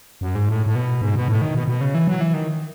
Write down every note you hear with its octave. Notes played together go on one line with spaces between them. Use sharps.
F#2
G#2
A2
A2
B2
G#2
B2
A2
D#3
B2
B2
C#3
E3
F#3
E3
D#3